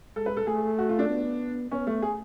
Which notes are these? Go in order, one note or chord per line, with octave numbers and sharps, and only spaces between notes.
G#3 A4
B4
A4
A3 G#4
F#4
F4
D4
B3
B3 C#4
A3
G#4